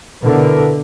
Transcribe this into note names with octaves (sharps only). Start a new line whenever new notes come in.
B2 D3 E4 A#4 B4